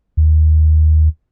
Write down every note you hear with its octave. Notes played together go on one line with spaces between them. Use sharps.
D#2